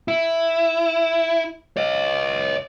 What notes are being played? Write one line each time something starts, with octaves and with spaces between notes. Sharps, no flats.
E4
C#5 D#5